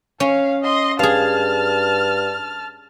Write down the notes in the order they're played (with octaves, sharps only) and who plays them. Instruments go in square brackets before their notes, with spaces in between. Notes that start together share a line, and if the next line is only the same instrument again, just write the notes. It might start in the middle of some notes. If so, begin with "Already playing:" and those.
[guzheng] C#4 [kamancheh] C#5 F5
[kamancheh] D#5 C6
[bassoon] G2 [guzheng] G#4 F5 [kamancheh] A5 F6